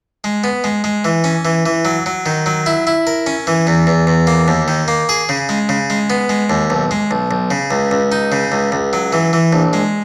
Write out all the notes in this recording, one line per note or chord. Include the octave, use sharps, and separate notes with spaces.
G#3
B3
G#3
G#3
E3
C#4
E3
E3
F#3
F#3
D#3
F#3
E4
E4
A#4
C#4
E3
E2
E2
E2
A#3
D#2
D#3
A#3
G#4
C#3
G#3
C#3
G#3
B3
G#3
D#2
B1
G#3
B1
B1
C#3
C#2
C#2
D#4
C#3
C#2
C#2
F#3
E3
E3
A#1
G#3